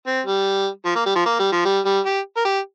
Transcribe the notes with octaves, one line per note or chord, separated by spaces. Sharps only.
C4
G3
F3
A#3
G3
F3
A#3
G3
F3
G3
G3
G4
A#4
G4